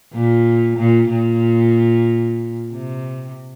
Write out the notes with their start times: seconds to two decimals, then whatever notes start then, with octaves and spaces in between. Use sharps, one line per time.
0.13 A#2
0.77 A#2
1.10 A#2
2.71 C3